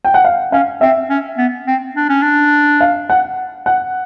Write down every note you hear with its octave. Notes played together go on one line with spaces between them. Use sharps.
G5
F#5
F5
C#4 F5
C4 E5
C#4
B3
C4
D4
C#4
D4
F5
F#5
F#5